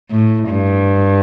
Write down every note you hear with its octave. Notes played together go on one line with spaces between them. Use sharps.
A2
G2